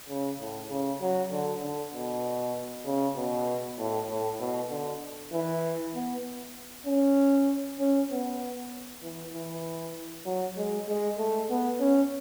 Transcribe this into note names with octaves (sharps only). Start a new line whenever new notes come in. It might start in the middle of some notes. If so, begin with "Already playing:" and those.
C#3
A2
C#3
F#3
D3
D3
B2
C#3
B2
A2
A2
B2
D3
E3
B3
C#4
C#4
B3
E3
E3
F#3
G#3
G#3
A3
B3
C#4